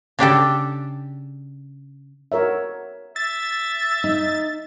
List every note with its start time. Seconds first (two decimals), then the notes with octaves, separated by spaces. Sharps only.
0.19 C#3 D4 G4 A4
2.32 F#4 A#4 C#5 E5
3.16 E5 A6
4.04 D#4